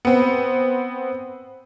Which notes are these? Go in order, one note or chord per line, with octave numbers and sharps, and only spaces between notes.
B3 C4